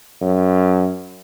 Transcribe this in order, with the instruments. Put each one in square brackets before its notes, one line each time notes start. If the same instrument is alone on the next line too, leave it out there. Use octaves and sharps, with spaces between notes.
[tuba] F#2